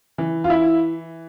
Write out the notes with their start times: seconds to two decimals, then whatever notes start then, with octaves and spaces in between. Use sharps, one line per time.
0.18 E3
0.44 F4
0.50 E4